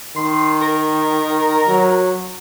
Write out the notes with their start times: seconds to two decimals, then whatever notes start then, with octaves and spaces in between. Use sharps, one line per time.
0.16 D#3 C6
0.61 A#4
1.67 F#3